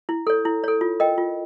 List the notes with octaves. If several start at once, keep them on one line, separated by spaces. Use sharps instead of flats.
E4
A4 C#5
E4
A4 C#5
F4
A#4 D#5 G5
F4